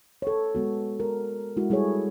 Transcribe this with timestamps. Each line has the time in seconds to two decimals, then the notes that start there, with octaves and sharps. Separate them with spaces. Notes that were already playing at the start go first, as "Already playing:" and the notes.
0.22 A4 C#5
0.55 G#3 B3 F#4
1.00 A#4
1.57 G#3 E4 F#4
1.70 G3 E4 G#4 A4 C#5